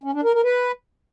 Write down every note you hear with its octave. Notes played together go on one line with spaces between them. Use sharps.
C#4
D4
A#4
A#4
B4